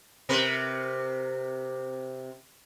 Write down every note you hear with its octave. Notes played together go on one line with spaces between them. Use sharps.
C3 A#4 B4